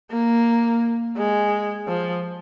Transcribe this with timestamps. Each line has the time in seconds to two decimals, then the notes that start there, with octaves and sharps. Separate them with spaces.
0.11 A#3
1.17 G#3
1.88 F3